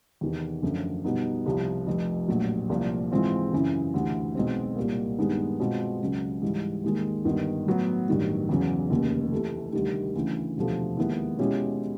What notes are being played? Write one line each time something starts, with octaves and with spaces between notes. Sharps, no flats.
E2 C3 D#3
F#2 D3 F3 A3
B2 G3 B3 D#4
C2 C3 F3
F1 F2 C3
A#1 A2 F#3
C2 A#2 F3
G#2 E3 G#3 C4 F4
F#2 C#3 E3
D2 C3 E3
B1 B2 G#3 C4
C2 A#2 G3 A#3
G2 D#3 G#3 B3 D#4
B2 G#3 C4 F4
C#2 C#3 F#3
G#2 E3 G3
D#2 D#3 G#3
G1 G2 D#3
A2 F#3 B3
A1 G2 D#3 F#3
E2 C#3 F#3
F1 D#2 C#3
C3 E3 A3
D2 C3 D#3 G3
D2 C#3 E3
E1 D2 C3 F3 A3
D#2 D#3 G#3 B3 E4
B2 G#3 C#4 E4 G4